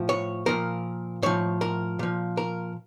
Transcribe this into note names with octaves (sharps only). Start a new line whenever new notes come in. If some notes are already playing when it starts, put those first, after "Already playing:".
Already playing: A2 F3
C#5
A#2 F3 A#4
A2 F3 C#5
A#4
A#2 F3
A#4